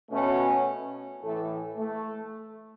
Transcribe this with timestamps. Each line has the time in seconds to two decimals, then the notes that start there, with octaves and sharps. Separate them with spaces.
0.11 B2 A3 C#4
1.22 A2 E3 A3
1.78 A3